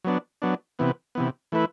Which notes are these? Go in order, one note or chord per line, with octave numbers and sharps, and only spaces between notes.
F#3 B3 D4
F#3 B3 D4
C3 E3 B3
C3 E3 B3
E3 A3 E4 B4